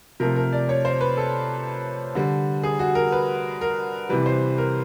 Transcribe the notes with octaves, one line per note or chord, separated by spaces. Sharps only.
C3 F3 A3 A#4
A#4
D5
C#5
C5
B4
A4
D3 G3
G#4
F#4
A#4
B4
A#4
C3 E3 G3 B4
C5
A#4